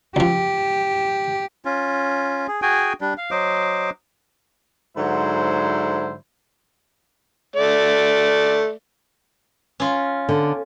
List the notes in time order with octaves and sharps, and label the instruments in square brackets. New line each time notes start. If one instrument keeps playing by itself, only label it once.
[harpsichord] C#2 F3 [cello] G4
[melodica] C#4 F4
G#4
F#4 G#4 G5 G#5
G3 D4
F5
F#3 C5 D#5 D6
[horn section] G#2 D3 F#3 E4 C5
[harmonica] A3 D5
[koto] C#4 F4
[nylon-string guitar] D3